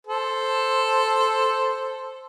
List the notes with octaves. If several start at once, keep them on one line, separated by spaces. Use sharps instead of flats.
A4 C5